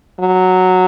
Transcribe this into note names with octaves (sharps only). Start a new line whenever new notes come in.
F#3